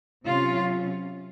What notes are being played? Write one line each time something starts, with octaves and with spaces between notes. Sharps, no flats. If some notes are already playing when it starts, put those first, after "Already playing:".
C3 F#3 C#4 F4